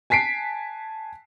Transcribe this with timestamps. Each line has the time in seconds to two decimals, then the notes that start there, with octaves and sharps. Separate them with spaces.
0.10 G#5 A5 B6 C7 D7